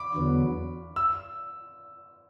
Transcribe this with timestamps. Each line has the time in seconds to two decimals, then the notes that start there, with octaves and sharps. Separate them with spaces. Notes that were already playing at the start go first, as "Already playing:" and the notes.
Already playing: B5 D6
0.14 E2 D3 F#3 B3
0.96 E6